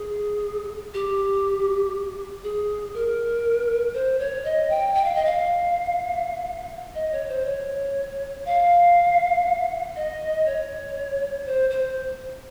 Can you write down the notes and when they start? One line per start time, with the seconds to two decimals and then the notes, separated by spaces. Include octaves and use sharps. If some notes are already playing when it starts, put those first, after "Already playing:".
Already playing: G#4
0.94 G4
2.44 G#4
2.94 A#4
3.94 C5
4.19 C#5
4.45 D#5
4.70 G5
4.95 G5
5.05 F5
5.15 D#5
5.25 F5
6.95 D#5
7.12 C#5
7.29 C5
7.46 C#5
8.45 F5
9.96 D#5
10.46 C#5
11.46 C5
11.71 C5